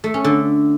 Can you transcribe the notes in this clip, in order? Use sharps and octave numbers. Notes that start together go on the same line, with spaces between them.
A3
C#4
D3